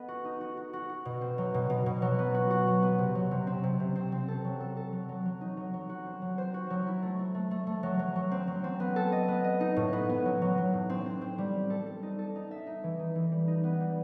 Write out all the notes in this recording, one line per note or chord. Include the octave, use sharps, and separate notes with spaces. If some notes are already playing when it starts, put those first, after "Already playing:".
Already playing: B3 A4 D#5
F#4
D#4
F#4
F#4
F#4
F#4
B2
C4
F#3
B2
B2
B2
F#3
B3
F#4
F#4
F#3
B3
C3
F#3
C3
C4
C3
C3
C4
C4
A4
F#3
A4
A4
F#3
F#3
F#3
D#4
F#3
F#3
F#4
C4
F#3
C5
F#4
F#3
E4
A3
A3
A3
A3
A3
F#3
F#3
F#3
C4
F#3
C4
B3
A4
D#5
B3
D#5
D#4
A2
B3
B3
F#3
F#3
F#3
A2
C4
C4
C4
G3
C4
A4
A4
D#4
A4
D#4
E5
D#4
E3
D#4
E3
G3
D#4
B3
G3